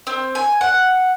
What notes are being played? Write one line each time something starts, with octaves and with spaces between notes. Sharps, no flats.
C4
G#5
F#5